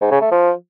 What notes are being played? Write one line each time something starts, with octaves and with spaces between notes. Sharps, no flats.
G#2
C#3
A3
F3